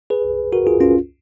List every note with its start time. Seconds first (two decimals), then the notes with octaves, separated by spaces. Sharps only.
0.10 G#4 B4
0.52 F#4 A#4
0.67 F4 G#4
0.80 C#4 F4